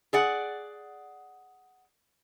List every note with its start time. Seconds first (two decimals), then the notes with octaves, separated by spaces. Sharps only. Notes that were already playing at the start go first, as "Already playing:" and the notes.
0.13 G#4 D5 F#5